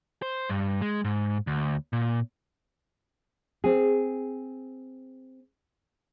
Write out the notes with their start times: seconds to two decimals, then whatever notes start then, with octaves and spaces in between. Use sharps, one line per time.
0.22 C5
0.50 G2
0.81 G#3
1.05 G#2
1.47 D2
1.93 A#2
3.64 C4 G#4